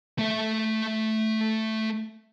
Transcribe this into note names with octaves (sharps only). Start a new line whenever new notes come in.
A3 E5